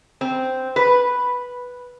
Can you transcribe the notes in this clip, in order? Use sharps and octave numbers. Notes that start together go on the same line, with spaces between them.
C4
B4